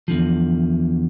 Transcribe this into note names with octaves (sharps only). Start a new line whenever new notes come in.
E2 D3 F3